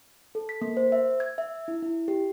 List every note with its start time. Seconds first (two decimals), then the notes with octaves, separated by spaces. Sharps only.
0.35 A4
0.49 B6
0.61 A#3
0.77 C5
0.92 E5
1.20 G#6
1.38 E5
1.68 E4
1.82 E4
2.08 G4